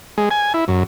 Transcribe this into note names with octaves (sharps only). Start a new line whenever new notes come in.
G#3
G#5
E4
F#2